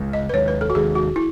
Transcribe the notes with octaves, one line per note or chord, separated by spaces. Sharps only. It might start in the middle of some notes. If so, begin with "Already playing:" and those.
Already playing: C#2 C#3 G#3
D#5
B4
D#2 D#3 G#3 C#5
B4
A4
F#4
D#2 D#3 G#3 G#4
F#4
E4